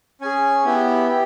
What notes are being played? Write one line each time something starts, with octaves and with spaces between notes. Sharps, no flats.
C#4 G#4 G#5
B3 E4 G4
G4